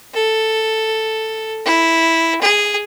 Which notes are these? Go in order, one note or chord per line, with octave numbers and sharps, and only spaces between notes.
A4
E4
G#4